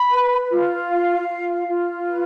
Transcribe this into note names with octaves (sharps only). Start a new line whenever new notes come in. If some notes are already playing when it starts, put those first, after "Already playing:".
Already playing: B5
B4
F4
F5
F4
F4
B4